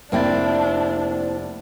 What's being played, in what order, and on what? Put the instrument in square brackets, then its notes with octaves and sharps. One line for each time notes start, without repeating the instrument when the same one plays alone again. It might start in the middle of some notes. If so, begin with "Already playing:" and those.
[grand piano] F1 G5 A6 [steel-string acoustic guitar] A#3 C4 E4 [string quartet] D4